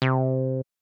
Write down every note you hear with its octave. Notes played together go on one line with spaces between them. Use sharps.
C3